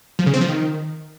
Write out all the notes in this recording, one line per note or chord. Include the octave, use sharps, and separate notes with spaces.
F3
C#3
C4
F3
D#3